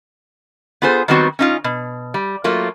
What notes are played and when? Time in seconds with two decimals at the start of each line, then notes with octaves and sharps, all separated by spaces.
0.82 B3 F4 G#4 A4 C5
1.08 D#3 F#3 G3 B3 C4 F#4
1.39 C#4 D#4 F4
1.64 B2
2.14 G3
2.44 F#3 A3 A#3 F4